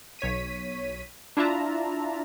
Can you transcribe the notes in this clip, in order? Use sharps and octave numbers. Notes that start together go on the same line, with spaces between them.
B1 C#5 B6 D#7
D4 E4 F4 E5 A5 A#5